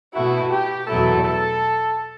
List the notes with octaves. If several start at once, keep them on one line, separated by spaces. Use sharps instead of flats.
B2 A3 E4 F#4
G4
E2 B2 F#3 A3 E4 A4
A4